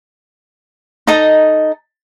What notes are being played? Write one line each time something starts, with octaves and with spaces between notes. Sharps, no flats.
D#4 A4 D#5 A#5